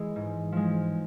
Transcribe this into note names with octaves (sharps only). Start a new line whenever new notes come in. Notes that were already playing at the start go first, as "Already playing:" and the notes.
Already playing: E3 G#3 G#4
G#2
F3 G#3